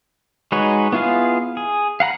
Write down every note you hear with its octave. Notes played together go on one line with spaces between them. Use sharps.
G#3 D#4 F#4 B4 C#5
B3 E4 F4 G#4 F5
G#4
F5 F#5 A#5 B5